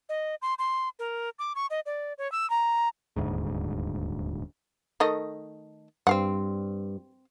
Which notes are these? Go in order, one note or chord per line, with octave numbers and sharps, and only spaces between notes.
D#5
C6
C6
A#4
D6
C#6
D#5
D5
C#5
E6
A#5
D#1 D2 G#2
D#3 A3 D#5
G2 C4 F5 F#5